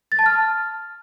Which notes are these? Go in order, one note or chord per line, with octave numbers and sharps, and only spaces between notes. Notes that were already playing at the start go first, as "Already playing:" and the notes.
A6
A5
F6